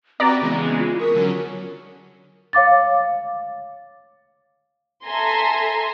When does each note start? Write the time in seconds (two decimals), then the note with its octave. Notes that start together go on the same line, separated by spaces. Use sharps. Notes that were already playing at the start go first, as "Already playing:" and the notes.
0.20 C4 F#4 G4 B4 D5 A#5
0.41 C#3 E3 G#3 B3
0.78 F4
0.99 A#4 C#6 D#6 B6
1.15 D3 F#3 C#4
2.53 C#5 F5 D6 A6
5.05 A4 E5 G#5 A#5 C6